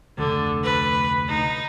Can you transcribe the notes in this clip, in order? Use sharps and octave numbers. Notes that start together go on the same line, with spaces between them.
F1 D2 D3
B4
D#4